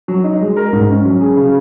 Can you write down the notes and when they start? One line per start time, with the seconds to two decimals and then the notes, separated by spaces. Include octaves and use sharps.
0.08 F#3
0.24 D#4
0.41 G#3
0.57 A#4
0.73 G#2
0.89 C#4
1.05 F#3
1.21 G#4
1.37 C#3